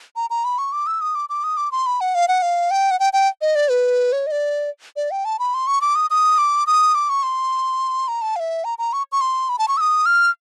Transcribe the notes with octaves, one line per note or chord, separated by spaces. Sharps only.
A#5
A#5
B5
C#6
D6
E6
D#6
D6
D6
D#6
D6
C6
B5
F#5
F5
F#5
F5
G5
F#5
G5
G5
D#5
D5
B4
C#5
D#5
D5
D5
G5
A5
B5
C6
C#6
D6
D#6
D#6
D6
D#6
D6
C#6
C6
A#5
A5
F5
E5
A#5
A#5
C#6
C#6
C6
B5
A5
C#6
E6
D#6
F6